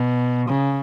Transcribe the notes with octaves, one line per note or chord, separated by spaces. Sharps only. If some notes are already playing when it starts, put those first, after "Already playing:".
Already playing: B2
C#3